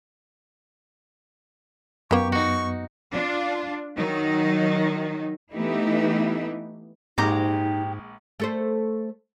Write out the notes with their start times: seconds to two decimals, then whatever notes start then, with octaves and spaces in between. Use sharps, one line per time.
2.11 F#2 D#3 A#3 B3 G4 C#6
2.32 D#4 F#4 C#6
3.11 D4 F4
3.96 D#3 F#3 D#4
5.55 E3 A3 B3 D#4 E4 G4
7.18 A#1 G#2 G#3 D#4 G4 A#5 D6
8.40 A3 A4 C5